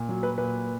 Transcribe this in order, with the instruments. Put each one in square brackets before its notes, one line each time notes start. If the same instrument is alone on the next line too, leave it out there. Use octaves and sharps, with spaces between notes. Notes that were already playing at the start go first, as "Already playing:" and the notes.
Already playing: [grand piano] A#2
F#3
B4
A#2 B4